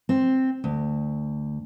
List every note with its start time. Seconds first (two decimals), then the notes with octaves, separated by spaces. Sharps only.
0.09 C4
0.64 D2